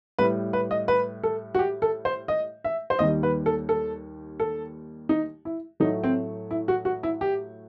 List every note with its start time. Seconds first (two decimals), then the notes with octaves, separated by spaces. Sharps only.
0.19 A2 G3 B4
0.53 B4
0.71 D#5
0.88 B4
1.23 A4
1.55 F#4
1.59 G4
1.82 A4
2.05 C5
2.28 D#5
2.64 E5
2.90 C5
2.99 D#2 D#3 G3 D#5
3.23 B4
3.46 A4
3.69 A4
4.40 A4
5.09 D#4
5.45 E4
5.80 A2 F#3 A3 D#4
6.04 C4
6.51 E4
6.68 F#4
6.85 F#4
7.03 E4
7.21 G4